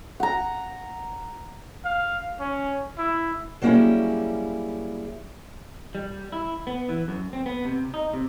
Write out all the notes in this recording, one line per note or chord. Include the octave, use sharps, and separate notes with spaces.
F#5 A#5
F5
C#4
E4
F#3 G3 A#3 C#4 E4 G#4
G3
E4
B3
E3
F#2
C4
B3
C3
D#4
C3